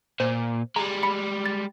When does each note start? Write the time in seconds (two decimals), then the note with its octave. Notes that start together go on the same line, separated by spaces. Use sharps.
0.20 A#2 C5
0.76 G3 G#3 A#5
1.03 B5 C#7
1.46 A6